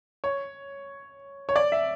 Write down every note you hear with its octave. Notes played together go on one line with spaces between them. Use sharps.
C#5
C#5
D5
E5